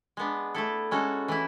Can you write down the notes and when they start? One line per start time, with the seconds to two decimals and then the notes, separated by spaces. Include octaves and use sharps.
0.17 G#3 B3 D4
0.55 A3 E4 A4
0.91 G#3 C#4 F#4 A4
1.28 E3 A3 E4